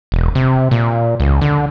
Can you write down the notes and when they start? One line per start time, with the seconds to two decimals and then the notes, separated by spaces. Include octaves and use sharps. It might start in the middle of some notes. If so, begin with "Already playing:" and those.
0.12 E1
0.35 C3
0.71 A#2
1.20 C#2
1.41 D3